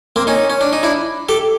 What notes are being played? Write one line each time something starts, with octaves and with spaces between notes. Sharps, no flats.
A#3 C4
C#4 D#4
C#4
D4
D#4
D4 E4
G4 A4